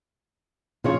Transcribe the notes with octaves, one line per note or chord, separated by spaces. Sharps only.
A#2 C#3 F3 F4 G#4 C#5